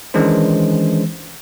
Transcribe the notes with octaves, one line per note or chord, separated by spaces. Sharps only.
D#3 E3 G#3 C#4 D4 C5